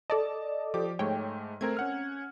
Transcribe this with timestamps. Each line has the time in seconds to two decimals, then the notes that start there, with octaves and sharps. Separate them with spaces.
0.10 A4 D5 D#5 A5
0.74 F3 G4 D6
0.99 G#2 G#3 A3 C#5 G5
1.61 A3 C4 A#4 G#6
1.77 C#4 F#5 F6